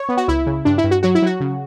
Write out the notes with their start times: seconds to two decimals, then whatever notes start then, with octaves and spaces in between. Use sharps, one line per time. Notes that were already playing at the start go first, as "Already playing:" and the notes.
Already playing: C#5
0.09 B3
0.17 F#4
0.28 C#2 E4
0.46 C#3
0.65 G2 D4
0.78 E4
0.84 G2
0.91 F#4
1.03 F#3 F#4
1.15 E4
1.22 F#3 F#4
1.40 C#3